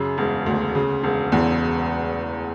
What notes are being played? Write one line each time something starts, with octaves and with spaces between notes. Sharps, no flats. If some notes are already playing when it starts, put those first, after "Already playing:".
Already playing: F#2 C#3
E1
D2
C#3
E1
E2